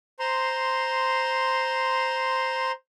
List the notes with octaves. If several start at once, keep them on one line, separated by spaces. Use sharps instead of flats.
C5 A#5 C6